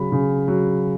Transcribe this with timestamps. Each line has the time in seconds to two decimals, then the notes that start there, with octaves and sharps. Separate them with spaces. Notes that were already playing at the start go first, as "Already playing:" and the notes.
Already playing: C#3 F#3 B5
0.12 C#3
0.48 F#3